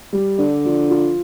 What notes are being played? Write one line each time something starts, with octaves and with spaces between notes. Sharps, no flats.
G3
D3 D4
F3
F4